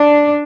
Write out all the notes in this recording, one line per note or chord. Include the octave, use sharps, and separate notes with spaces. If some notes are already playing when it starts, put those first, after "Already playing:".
Already playing: D4